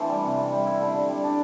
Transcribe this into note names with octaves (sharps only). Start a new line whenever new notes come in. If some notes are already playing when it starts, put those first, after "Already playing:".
Already playing: E3 A3 C4 D4 A4 C5
G3
C3
C3
G3
E4
D3
D3
G3
D4